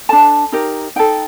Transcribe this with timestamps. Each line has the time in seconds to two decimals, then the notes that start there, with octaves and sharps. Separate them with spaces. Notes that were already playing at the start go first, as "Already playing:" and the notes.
0.09 D4 A4 A5
0.52 D#4 G4 A#4
0.96 D#4 A4 G5